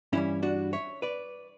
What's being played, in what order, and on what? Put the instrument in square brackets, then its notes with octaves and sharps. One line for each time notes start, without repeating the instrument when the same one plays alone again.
[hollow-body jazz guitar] G2 E3 G3 C#4 E4
D4 F#4
C#5 E5
B4 D5